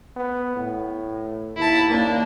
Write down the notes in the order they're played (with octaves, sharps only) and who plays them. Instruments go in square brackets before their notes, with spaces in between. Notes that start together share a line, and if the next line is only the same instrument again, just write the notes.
[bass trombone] B3
A2
[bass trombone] D#2 [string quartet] E4 A5
[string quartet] A#3 D4